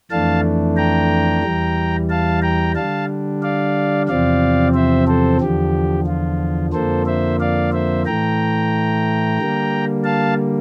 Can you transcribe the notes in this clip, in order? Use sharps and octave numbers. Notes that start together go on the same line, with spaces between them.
F2 E3 A3 D4 F5 A5
G5 A#5
E2 E3 G3
F5 A5
G5 A#5
D3 G3 D4 F5 A5
D5 F5
E2 C3 F3 C4 D5 F5
C5 E5
A4 C5
E2 D3 F3 G4
F4
F2 D3 F3 A#3 A4 C5
C5 E5
D5 F5
C5 E5
A2 E3 A3 G5 A#5
D3 G3 A#3
F5 A5